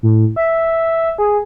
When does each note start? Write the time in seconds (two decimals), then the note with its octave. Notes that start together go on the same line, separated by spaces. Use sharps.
0.03 A2
0.36 E5
1.18 G#4